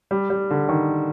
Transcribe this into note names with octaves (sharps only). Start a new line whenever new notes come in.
G3
G3
D3
D#3